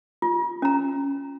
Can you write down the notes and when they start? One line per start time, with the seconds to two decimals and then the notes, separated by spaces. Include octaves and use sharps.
0.22 F4
0.62 C#4 A#5